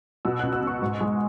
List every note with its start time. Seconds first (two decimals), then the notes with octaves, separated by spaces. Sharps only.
0.25 B2 E6
0.39 C#2 F#6
0.53 E6
0.62 C#2
0.67 C#6
0.82 G#2
1.01 G#3